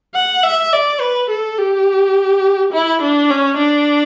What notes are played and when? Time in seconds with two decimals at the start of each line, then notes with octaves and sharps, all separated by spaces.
0.15 F#5
0.43 E5
0.72 D5
1.00 B4
1.30 A4
1.58 G4
2.73 E4
3.02 D4
3.30 C#4
3.58 D4